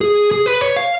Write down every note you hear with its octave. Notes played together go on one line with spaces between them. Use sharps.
G#4
G#4
B4
C#5
F5